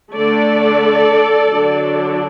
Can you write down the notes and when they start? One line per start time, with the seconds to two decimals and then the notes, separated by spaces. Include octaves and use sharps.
0.13 D3 A3 D4 A4 D5
1.49 D3 F#3 D4